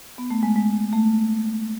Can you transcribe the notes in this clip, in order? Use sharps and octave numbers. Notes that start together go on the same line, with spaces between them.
B3
A3
G#3
G#3
A3